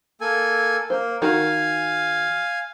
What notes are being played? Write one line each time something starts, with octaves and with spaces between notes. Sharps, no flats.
A#3 A4 G#5
A#3 C5
D#3 F#4 A#4 F5 G#5